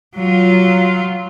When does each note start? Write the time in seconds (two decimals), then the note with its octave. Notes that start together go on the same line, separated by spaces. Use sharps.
0.16 F#3 F4